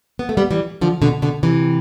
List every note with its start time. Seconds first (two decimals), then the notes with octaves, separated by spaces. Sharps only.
0.19 B3
0.29 A3
0.37 G3 B3
0.51 E3 G3
0.81 D3 F3
1.02 B2 D3
1.22 B2 D3
1.43 C3 E3